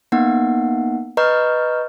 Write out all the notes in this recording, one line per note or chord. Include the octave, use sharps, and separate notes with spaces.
A#3 B3 D#4 F#5
B4 D#5 A#5 C#6 F6 G6